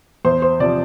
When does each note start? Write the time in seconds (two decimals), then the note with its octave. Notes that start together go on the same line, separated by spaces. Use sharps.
0.25 E2 C5
0.42 C5
0.60 C3 F3 D5